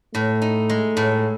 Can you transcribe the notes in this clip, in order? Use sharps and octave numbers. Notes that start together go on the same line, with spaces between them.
A2 A3
D#4
G#3
A2